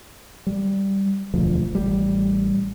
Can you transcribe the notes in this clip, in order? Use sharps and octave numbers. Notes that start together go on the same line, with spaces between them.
G3
E1 D2 F3
A1 G3